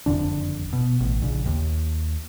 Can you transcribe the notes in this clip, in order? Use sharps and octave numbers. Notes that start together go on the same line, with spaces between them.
F#1 F2 D3 D4
B2
A1
A#1 C#3
D#2